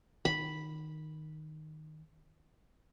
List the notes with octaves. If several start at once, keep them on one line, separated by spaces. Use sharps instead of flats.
D#3 B5